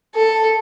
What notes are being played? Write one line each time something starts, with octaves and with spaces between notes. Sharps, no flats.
A4